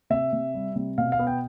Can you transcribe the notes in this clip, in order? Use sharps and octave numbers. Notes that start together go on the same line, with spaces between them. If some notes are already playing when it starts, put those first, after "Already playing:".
C3 E5
C3
G3
C3
B2 F5
F5
B3
G5